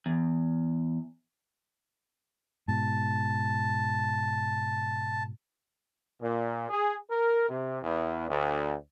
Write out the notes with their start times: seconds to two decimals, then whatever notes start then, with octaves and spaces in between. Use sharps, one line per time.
0.06 E2
2.68 G#2 B2 A5
6.22 A#2
6.69 G#4
7.10 A#4
7.49 C3
7.83 E2
8.29 D2